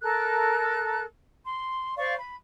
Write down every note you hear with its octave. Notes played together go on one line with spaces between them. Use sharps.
A4 A#4 F#6
C6
C5 D5 F5 C#6
B5